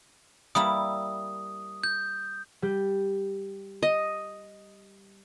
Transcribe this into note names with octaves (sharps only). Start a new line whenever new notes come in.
G3 A#3 E4 D#6
G6
G3 G6
D#5